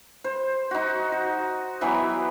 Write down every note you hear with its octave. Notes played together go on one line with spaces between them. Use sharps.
C5
D#4 F#4
F#4
E3 F#3 B3 G4